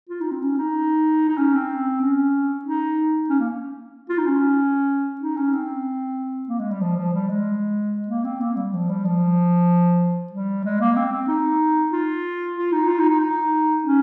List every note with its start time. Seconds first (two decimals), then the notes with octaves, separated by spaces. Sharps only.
0.09 F4
0.21 D#4
0.32 C4
0.42 C#4
0.58 D#4
1.29 D#4
1.38 C#4
1.54 C4
2.02 C#4
2.65 D#4
3.29 C#4
3.40 A#3
4.09 F4
4.18 D#4
4.26 C#4
5.21 D#4
5.37 C#4
5.53 C4
6.49 A#3
6.60 G#3
6.71 G3
6.81 F3
6.97 F3
7.13 G3
7.29 G#3
8.08 A#3
8.24 C4
8.40 A#3
8.57 G3
8.73 F3
8.89 G3
9.05 F3
10.33 G3
10.65 G#3
10.81 A#3
10.96 C4
11.12 C4
11.28 D#4
11.92 F4
12.56 F4
12.72 D#4
12.88 F4
12.99 D#4
13.09 D#4
13.20 D#4
13.84 C#4